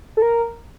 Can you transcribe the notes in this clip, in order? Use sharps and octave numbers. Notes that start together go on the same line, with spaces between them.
A4
A#4